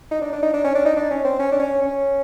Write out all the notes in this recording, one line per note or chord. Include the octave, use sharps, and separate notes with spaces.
D#4
D4
D4
D#4
D4
C#4
D4
D#4
D4
C#4
C4
C#4
D4
C#4
C#4